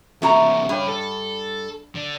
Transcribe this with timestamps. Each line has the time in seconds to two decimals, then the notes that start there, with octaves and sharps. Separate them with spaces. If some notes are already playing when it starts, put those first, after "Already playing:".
0.22 C2 A3 A#3 F#4 A#5
0.69 G2 G#4 C#5
0.89 A4
1.95 D3